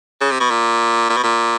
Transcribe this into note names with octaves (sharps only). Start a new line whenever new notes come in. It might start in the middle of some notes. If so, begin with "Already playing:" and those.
C#3
C3
B2
A#2
A#2
B2
A#2